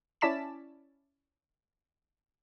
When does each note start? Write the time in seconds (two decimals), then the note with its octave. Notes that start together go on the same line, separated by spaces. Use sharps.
0.21 C#4 E4 D5 A5 B6 E7